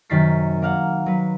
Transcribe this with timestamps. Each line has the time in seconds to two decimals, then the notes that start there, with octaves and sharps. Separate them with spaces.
0.10 F#2 C3 D#3 A6 B6 C7
0.62 A#3 F5 F#5
1.06 F#3 B4